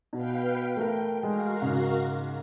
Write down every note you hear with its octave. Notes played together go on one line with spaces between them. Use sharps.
B2 B4 F5 G5
A3 A#4 G5
G#3 F#4 A#4 F5
G#2 C#3